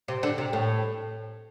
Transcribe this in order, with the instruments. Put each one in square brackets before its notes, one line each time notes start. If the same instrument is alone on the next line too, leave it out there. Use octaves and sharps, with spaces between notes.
[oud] C3
D3
C3
A2